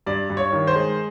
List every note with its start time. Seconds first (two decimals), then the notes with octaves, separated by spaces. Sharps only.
0.07 G2 D5
0.30 G2
0.37 C#5
0.52 D#3
0.67 C5
0.75 G#3